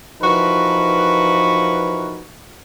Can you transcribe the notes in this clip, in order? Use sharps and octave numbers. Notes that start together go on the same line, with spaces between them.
E3 F3 D#4 F#4 A#4 B4